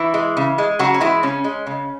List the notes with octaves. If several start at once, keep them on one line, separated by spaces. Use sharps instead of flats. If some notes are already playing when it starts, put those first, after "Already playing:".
Already playing: E3 E4
G#3
C#3
G#3
C#3 F#3 F#4
C#4
E3 G#3 E4
C#3 C#4
G#3
C#3